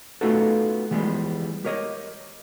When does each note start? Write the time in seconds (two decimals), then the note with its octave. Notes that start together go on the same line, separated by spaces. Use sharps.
0.21 A3 B3 D#4 F4 F#4 A4
0.91 E3 F3 G3 G#3 B3
1.65 G4 A#4 C#5 D#5